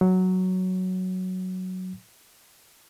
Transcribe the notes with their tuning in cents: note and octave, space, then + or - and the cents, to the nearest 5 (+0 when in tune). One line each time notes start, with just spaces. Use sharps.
F#3 +0